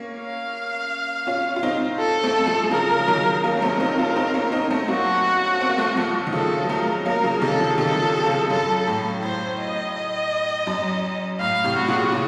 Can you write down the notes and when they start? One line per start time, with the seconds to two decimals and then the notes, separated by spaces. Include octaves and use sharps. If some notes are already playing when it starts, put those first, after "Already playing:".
Already playing: A#3 C#4
0.18 F5
1.27 C#4 F4
1.56 F4
1.63 C4 D#4
1.99 A4
2.23 A3 C4
2.47 F3 A3
2.71 C#3 F3 A#4
2.99 F3
3.07 D#3 F#3
3.44 F#3 A#3 A#4
3.57 C#4
3.62 A3 C4
3.80 C4 D#4
3.98 C#4 F4
4.16 C4 D#4
4.34 A#3 C#4
4.52 C4 D#4
4.70 A3 C4
4.88 F#3 A#3 F#4
5.61 C4
5.69 A#3
5.78 A3 C4
5.97 F3 A3
6.27 D#3
6.33 C#3 F3 A4
6.63 F#3
6.69 F3 A3 A#4
7.05 F#3 A#3 A#4
7.24 C#3 F3
7.41 C3 D#3 A4
7.60 C#3 F3
7.78 C3 D#3 A4
8.03 C#3 F3
8.26 C#3 F3
8.50 F#2 A4
8.87 A2
9.23 A2 C5
9.59 D#5
9.95 D#5
10.67 F#2
11.40 A2 F5
11.64 A2 C3
11.76 F#4
11.88 A#2 C#3
12.12 A#2 C#3